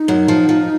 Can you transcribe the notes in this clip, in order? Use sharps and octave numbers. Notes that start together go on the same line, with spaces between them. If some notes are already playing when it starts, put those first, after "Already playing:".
Already playing: D#4
F#2 F#3
F3
F3